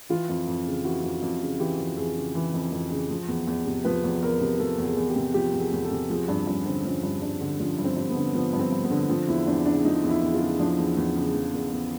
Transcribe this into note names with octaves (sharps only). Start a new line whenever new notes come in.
E3 F4
F2
F2
C#3
E3 F#4
F2
F2
C#3
E3 G4
F2
F2 G#4
C#3
E3
F2
F2
C#3
F3
E2
E2
C3
F3 B4
E2
E2 A#4
C3
F3 A4
E2
G#4
E2
G4
C3
F3 G4
E2
G#4
E2
A4
C3
F3 G#4
G2 D4
G2 C#4
D3 C4
F3 C#4
G2
G2 D4
D3
F3 C#4
G2
C4
G2
B3
D3
F3 B3
G2
C4
G2
B3
D3
F3 C4
E2 E4
E2 D4
C#3 D4
F3 D#4
E2
E4
E2
F4
C#3
F3 D4
E2
E2
C#3
F3
E2
E2